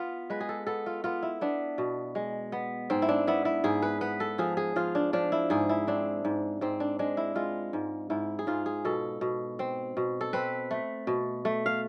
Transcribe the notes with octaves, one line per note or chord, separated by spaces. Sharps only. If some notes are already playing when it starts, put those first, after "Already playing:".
Already playing: B3 F4
G#3 B4
G#4
A4
B3 A4
F4
B3 F4
E4
B3 D4
B2
G#3
B3
G#2 C4
E4
D4
B3 E4
E4
G#2 G#4
B4
B3 B4
A4
F3 G#4
G#4
F3 F4
D4
F3 D4
E4
G#2 G#4
E4
C4 D4
G#2
G#2 C4
D4
G#3 D4
E4
G#3 F4
G#2
G#2 E4
G#4
G#2 F4
G#4
B2 A4
B2
C4
B2
A4
C4 B4
A3
B2
A3
F5